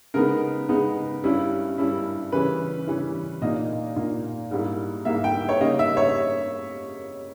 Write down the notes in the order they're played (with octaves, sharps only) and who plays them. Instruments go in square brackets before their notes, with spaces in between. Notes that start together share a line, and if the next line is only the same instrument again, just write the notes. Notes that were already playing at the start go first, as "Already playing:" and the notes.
[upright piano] C#3 G#3 B3 D#4 A#4
C#3 G#3 B3 D#4
G2 G3 C#4 E4
G2 G3 C#4 E4
C#3 E3 G3 C#4 E4 B4
C#3 E3 G3 C#4 E4
A#2 A#3 D#4 D#5
A#2 A#3 D#4
G#2 G3 A#3 E4
G#2 G3 A#3 E4 E5
G5
C#5
C#3 G3 A#3 D#4 D#5
E5
C#5